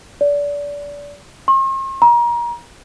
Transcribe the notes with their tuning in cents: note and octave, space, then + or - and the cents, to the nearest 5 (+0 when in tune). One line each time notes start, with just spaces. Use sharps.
D5 -30
C6 +45
A#5 +30